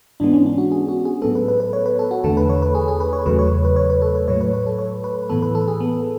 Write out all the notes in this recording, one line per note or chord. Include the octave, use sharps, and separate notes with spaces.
G#2 E3 G#3 B3 D4
C#4
D4
F#4
G#4
F#4
G#4
A2 F#3 B3 A4
B4
B4
B4
C#5
B4
A4
F#4
E2 D3 A3 A4
B4
C#5
B4
G#4
G#4
B4
C#5
E2 C#3 F#3 A3 B4
C#5
B4
C#5
B4
A4
B4
A2 F#3 A3 C#5
B4
B4
A4
C#5
B4
A2 E3 B3 A4
B4
A4
G#4
B3